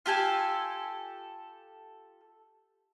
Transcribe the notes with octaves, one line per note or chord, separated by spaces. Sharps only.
F4 G4 A4 G#5